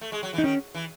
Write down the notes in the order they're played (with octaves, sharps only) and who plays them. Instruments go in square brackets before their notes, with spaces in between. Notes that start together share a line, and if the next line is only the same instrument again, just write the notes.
[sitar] A3
G#3
F#3
E3
[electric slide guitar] D#4
[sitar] D#3 [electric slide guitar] C#4
[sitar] E3